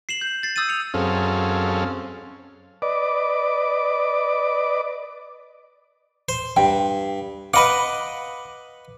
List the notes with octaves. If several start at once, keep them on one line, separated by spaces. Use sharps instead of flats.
C7 E7 F#7
G6
A6 C7
D#6 E6 G6 A6 D#7
C#7 F7
F#2 C4 C#4 G#4 A4 F5
B4 D5 D#5 D6
C5
G2 G5
B4 D#5 F5 F#5 B5 D6